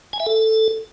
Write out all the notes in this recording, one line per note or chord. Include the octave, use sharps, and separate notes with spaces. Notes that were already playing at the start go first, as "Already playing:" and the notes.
G#5
E5
A4